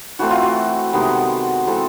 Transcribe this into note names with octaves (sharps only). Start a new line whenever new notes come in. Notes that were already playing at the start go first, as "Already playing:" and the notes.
E3 A3 C4 F#4
F4
F#4
C3 D#3 G#3 B3
E3 G#3 C4 A4